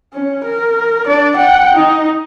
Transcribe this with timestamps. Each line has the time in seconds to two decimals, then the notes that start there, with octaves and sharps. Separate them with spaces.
0.13 C#4
0.45 A#4
1.07 D4 D5
1.37 F#5 G5
1.75 D#4